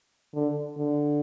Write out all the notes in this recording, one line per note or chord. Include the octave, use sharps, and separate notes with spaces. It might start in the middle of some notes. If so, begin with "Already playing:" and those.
D3
D3